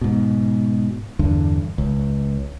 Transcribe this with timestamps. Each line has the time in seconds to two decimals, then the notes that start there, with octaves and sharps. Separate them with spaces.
0.01 G#2 B2
1.19 E2 G2 D3
1.78 C#2